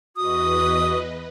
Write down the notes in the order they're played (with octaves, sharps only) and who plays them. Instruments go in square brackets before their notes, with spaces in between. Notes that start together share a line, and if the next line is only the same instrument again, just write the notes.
[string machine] E2 B4 D#5 [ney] F#4 [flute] D#6